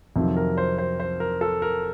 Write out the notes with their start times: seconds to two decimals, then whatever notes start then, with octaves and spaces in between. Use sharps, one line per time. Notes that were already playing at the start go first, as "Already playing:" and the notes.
0.16 F2 C3 D#3 F#3
0.36 A#4
0.57 C5
0.78 C5
1.00 C5
1.20 A#4
1.41 A4
1.62 A#4